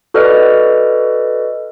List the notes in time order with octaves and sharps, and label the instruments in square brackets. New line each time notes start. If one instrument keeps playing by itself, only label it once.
[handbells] F#4 A4 B4 D5 D#5 F6